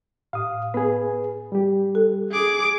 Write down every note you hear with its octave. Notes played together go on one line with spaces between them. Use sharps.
A2 F5 D#6
B3 G#4 B4
G3 G4
A4
G#4 D6